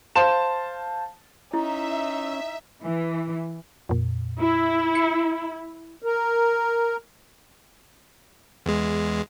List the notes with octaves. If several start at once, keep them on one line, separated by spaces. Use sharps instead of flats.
C5 F5 A5 E7
C#4 D#4 E4 E5
E3
F2 A#2
E4
C#7
A#4
E2 G#3